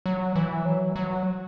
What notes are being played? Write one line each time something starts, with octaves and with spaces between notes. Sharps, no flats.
F#3
E3
F#3
F#3